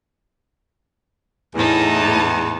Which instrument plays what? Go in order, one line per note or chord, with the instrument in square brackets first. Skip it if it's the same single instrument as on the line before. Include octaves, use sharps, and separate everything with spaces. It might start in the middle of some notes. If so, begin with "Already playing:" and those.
[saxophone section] E2 [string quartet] A2 D#4 A5